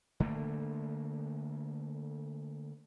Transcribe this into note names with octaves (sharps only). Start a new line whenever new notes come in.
D3 A3 A#3